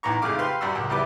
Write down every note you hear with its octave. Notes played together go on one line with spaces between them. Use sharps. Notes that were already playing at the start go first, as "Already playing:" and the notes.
B1 E3 A#5 C#6
F2 G#2 C#3 A3 F5 D6
G4 B4 F5 B5 C6
F#2 G3 F#4 E6
C#2
E2 G3 E4 B4 D6